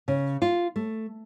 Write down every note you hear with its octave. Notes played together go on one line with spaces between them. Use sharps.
C#3
F4
A3